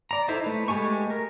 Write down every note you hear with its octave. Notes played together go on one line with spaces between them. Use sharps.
D5 A#5
D#4 E4 A4 C5 E5
A3 B4
G#3 A3 G4 G#5 C#6
A#4